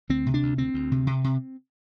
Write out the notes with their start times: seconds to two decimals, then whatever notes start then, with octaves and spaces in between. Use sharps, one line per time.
0.09 D2 C4
0.26 C3
0.34 D4
0.43 D2
0.58 D2 C4
0.74 D2
0.92 C3
1.07 C3
1.24 C3